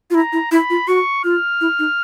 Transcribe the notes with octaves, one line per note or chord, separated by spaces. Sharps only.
F4
E4 A#5
E4
E4 B5
F4
F#4 C#6
F4 F6
E4
D#4